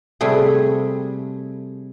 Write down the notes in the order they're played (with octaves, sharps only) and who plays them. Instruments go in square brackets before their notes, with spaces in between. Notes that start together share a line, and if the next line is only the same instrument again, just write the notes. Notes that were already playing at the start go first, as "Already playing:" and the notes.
[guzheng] C3 G3 A3 G#4